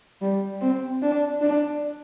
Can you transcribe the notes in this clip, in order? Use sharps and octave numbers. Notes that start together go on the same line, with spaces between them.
G3
C4
D4
D4